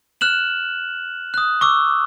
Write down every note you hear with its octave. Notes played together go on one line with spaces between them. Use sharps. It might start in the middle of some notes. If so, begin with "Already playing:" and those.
F6 F#6 E7 F#7
D#6 F#6
C#6 D6 E6